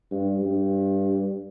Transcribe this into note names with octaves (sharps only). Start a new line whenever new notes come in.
G2
G2